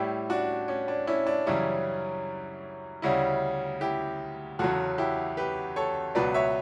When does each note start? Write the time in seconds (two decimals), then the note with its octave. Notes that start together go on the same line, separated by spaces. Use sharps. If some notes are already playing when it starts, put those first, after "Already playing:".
Already playing: A2 G3 E4 G4
0.30 D4 F#4
0.68 C#4
0.88 D4
1.07 C#4 E4
1.27 D4
1.46 F#2 C#3 E3 G3 C#4 E4
3.02 D2 C#3 G3 C#4 E4
3.81 E4 G4
4.59 E2 C#3 F#3 F#4 A4
4.98 E4 G4
5.37 G4 B4
5.76 A4 C#5
6.15 C#2 B2 F#3 B4 D5
6.34 C#5 E5